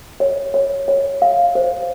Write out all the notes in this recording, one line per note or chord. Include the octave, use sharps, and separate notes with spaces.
C#5
C#5
C#5
F5
C5